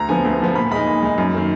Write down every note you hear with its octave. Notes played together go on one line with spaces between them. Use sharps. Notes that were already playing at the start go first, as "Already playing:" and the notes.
Already playing: D2 A#5
D3 F3 B3 G#5
D2
D3 F3 B3
A#2 B5
G#3 D#4 B5
A#2
G#3 D#4
F#2
D#3 A#3